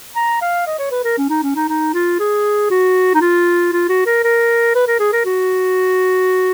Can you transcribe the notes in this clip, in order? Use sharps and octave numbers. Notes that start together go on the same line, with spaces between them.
A#5
F5
D#5
C#5
B4
A#4
C#4
D#4
C#4
D#4
D#4
F4
G#4
F#4
D#4
F4
F4
F#4
A#4
A#4
B4
A#4
G#4
A#4
F#4